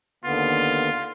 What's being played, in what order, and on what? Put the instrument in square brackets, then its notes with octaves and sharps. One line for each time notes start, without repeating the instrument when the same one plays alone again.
[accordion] D#2 D3 B3 [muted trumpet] F4